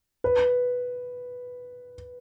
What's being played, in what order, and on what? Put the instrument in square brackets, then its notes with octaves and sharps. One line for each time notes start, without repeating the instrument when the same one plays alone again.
[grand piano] B4